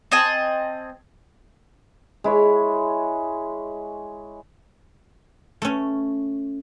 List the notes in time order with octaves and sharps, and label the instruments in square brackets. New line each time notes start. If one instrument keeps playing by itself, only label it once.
[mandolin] C4 D#5 G#5 A5
[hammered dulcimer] G#3 E4 C#5
[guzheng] A3 C#4